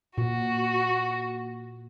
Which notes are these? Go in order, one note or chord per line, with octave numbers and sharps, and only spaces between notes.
A#2 F#4